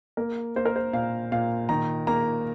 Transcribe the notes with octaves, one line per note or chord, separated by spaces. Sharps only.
A#3 A#4
A#3 C5
A#4
C5
A#2 F5
A#2 F5
D#3 A#5
A#3 A#5